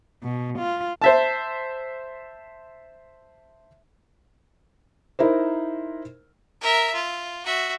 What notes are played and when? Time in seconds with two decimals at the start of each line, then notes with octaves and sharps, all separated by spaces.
0.23 B2
0.59 F4
1.02 C5 E5 A5
5.19 D#4 E4 A#4 C5
6.61 A#4 E5
6.94 F4
7.45 F#4 E5